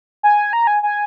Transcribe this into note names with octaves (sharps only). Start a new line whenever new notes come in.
G#5
A#5
G#5
G#5